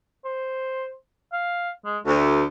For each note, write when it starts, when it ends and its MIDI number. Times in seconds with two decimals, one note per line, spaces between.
0.25 0.94 72
1.33 1.71 77
1.85 1.98 56
2.06 2.43 38
2.06 2.42 57